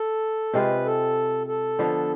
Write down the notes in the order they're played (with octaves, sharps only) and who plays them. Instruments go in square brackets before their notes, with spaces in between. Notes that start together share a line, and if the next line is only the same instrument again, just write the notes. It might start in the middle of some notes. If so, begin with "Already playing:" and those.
Already playing: [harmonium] A4
[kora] C3 G#3 C4 F4 [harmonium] B4
[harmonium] A4
A4
[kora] D3 F3 B3 D4